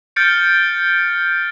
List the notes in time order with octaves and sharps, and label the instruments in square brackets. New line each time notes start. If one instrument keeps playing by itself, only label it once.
[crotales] F6 G6 A6 C#7 D7